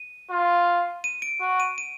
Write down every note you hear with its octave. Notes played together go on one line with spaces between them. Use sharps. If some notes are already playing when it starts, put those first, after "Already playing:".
Already playing: D#7
F4
D#7
D7
F#4
D#7
D#7